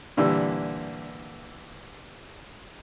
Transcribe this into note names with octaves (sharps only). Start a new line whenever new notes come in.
A#2 D3 E3 G3